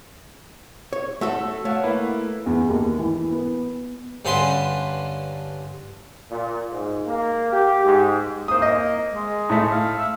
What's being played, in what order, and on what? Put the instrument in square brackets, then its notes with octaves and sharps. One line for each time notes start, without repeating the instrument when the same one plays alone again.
[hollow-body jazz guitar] C#5
[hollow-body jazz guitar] A3 F#4 A4 [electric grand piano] E5 A5 E6
[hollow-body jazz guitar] A3 [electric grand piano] C#5 F5 F#5
[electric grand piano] A#3 E4 B4
[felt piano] E2
D#2
E3
B3
[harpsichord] G2 D3 C#4 B4 C6
[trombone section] A#2
G#2
A#3
G4
G#2
[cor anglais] A#3 [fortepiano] C5 D#6
[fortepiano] D#5
[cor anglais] G#3
[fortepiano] A2 A3
[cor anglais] F5
E5